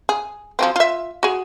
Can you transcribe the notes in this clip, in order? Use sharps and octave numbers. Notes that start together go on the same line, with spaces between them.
G#4
F3 F#3 C4
F4 E5
F#4 G#4